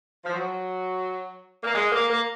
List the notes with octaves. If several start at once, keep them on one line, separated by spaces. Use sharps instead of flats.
F3
F#3
A#3
G#3
A#3
A#3